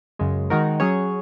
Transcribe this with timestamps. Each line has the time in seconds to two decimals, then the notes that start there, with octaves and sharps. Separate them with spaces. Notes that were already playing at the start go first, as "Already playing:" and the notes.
0.19 F#2 C#3 G#3
0.50 D#3 G#3 D#4 F#4 A#4
0.80 F#3 C#4 G#4 C#5